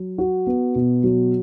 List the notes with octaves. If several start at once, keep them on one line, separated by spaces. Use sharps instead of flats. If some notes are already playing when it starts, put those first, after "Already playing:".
Already playing: F#3
F#4
B3
B2
F#3